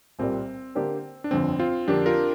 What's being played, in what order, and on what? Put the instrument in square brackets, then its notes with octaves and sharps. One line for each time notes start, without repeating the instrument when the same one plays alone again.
[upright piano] C2 A#2 G3 [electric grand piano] C4
[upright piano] D3 A#3 D4 G4 C5
[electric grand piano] D4
[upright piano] G1 F2 D3 [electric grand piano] C4
[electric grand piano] C4 F4
[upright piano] F2 D3 A#3 [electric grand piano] D4 G4
[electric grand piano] F4 A#4